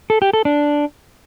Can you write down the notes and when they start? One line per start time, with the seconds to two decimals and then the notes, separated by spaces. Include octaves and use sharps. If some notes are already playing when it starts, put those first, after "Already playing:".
0.10 A4
0.22 G4
0.33 A4
0.45 D4